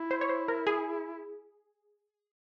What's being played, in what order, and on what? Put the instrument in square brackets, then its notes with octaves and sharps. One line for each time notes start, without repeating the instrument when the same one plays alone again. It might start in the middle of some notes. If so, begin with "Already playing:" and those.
Already playing: [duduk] E4
[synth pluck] C5
C#5
C5
A#4
G#4